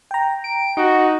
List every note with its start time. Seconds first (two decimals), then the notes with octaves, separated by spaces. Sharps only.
0.11 G5 A#5
0.44 D7
0.77 D#4 F#4